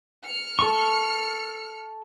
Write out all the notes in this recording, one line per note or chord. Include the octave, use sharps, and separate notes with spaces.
F6 C#7
A4 C#6